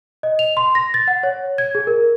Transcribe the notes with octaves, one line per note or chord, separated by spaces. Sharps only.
D#5
F7
C6
A#6
A6
F#5
C#5
G#6
G#4
A#4